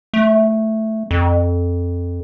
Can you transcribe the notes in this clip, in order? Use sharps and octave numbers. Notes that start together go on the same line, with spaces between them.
A3
F2